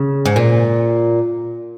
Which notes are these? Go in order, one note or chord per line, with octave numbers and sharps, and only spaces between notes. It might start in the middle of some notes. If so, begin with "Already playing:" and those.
Already playing: C#3
G#2
A#2